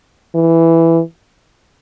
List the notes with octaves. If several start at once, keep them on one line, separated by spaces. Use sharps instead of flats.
E3